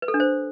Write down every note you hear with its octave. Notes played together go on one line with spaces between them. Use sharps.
B4
A4
D4
C5